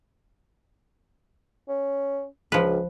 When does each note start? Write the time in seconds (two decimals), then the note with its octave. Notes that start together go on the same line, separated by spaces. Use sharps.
1.69 C#4
2.52 C#2 F3 B4